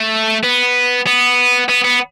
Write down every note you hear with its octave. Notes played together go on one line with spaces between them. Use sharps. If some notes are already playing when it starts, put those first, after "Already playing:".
Already playing: A3
B3
B3
B3
B3